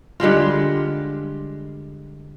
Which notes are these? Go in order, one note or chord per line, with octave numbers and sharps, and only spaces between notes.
D3 G3 G#3 F4